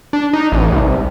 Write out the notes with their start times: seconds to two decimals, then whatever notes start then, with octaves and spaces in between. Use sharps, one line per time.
0.13 D4
0.33 D#4
0.52 A1
0.72 C2